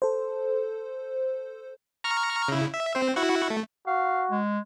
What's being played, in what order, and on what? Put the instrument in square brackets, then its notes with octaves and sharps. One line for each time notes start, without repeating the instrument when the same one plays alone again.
[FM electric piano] A4 C5
[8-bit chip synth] A#5 C#6 F6
C#3 E4
E5
C4 C5
E4 F#4 F#5
A3
[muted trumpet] F#4 [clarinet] F5
[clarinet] G#3